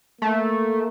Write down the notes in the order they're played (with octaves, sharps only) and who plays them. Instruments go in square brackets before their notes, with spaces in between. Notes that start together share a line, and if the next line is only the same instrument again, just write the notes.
[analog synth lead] A3 [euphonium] A#3